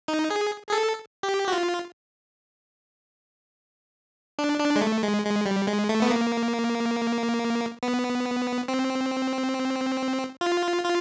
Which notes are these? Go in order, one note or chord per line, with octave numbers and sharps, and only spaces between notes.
D#4
G#4
G#4
A4
G4
F#4
F4
D4
D4
G#3
A3
G#3
G#3
G3
G#3
A3
B3
A#3
B3
C4
F4
F4